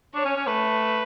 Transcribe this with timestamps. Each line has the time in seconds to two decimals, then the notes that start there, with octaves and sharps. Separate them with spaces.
0.15 D4 C#5
0.25 C#4
0.37 C#4
0.47 A3 B4